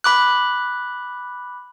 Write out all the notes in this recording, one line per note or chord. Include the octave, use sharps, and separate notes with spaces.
B5 D6 F#6